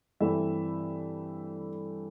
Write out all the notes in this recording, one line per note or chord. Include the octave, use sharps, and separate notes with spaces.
G2 E3 A3 C4 E5